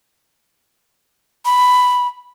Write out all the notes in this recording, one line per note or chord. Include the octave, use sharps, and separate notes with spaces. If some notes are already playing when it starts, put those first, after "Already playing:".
B5